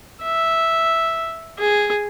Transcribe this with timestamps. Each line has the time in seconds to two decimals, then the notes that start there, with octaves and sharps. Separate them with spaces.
0.23 E5
1.59 G#4